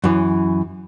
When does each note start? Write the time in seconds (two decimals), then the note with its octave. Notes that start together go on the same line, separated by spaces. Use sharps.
0.04 F#2 E3